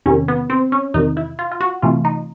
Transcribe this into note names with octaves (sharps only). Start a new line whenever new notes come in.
E2 C3 D#3 C#4
B3
C4
C#4
E2 C3 D#3 D#4
E4
F4
F4
F#4
C3 E3 A3 F4
D#4